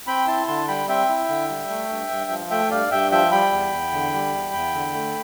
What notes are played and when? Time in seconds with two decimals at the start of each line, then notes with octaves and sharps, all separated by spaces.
0.07 C4 G5 B5
0.27 E4 A5 C6
0.48 D3 A5 C6
0.68 G3 G5 B5
0.88 C4 E5 G5
1.09 E4
1.29 D3
1.49 G3
1.69 A3
1.89 G2
2.10 G2
2.31 F3
2.50 A3 E5 G5
2.71 G2 D5 F5
2.91 G2 E5 G5
3.11 F3 E5 G5
3.32 G3 G5 B5
3.52 E2
3.72 E2
3.93 D3
4.13 G3
4.34 E2
4.54 E2
4.74 D3
4.94 A3